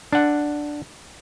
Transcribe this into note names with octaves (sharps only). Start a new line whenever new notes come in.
D4 F#5